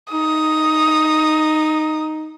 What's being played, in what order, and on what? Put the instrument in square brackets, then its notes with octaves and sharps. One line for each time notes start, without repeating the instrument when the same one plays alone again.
[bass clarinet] D#4 [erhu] D#6